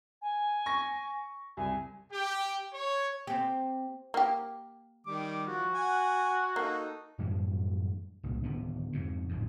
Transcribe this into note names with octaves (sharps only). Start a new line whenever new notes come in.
G#5
C#6 A#6
C2 G#5
G4
C#5
C4 G4
A#3 G4
D#3 G3 D6
F3 F#4
F#5 G#5
A#3 D#4 A4
F#2 A2 E3 G3
C2 A#2
D1 D3 D#3 B3
F2 G#2 C3
A1 F2 G#2